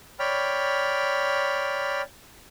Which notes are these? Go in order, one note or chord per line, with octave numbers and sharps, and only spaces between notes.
C#5 D5 G5 B5 F6